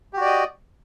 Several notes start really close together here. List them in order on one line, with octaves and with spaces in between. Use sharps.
G4 F#4 D5 D#5